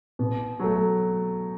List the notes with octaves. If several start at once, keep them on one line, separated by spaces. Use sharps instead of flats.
B2
F#3 A3